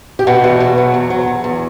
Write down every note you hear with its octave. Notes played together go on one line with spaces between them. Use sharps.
G4
B2 F#4
E2
B2
F#3
E2
F#3
E2
E2